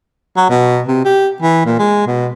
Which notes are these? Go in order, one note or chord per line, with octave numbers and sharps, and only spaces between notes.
F#3
B2
C3
G4
E3
A#2
G#3
B2